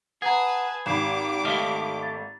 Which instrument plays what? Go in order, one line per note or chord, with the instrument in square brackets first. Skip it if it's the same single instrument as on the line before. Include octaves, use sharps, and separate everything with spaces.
[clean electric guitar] G#4 [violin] B4 A5 [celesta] F#5 A#5
[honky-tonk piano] G#1 [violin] G4 D6 [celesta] B5 C7 E7
[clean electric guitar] A3 D#5 F5
[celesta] A6